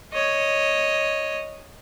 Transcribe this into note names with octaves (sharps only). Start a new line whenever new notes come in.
C#5 D#5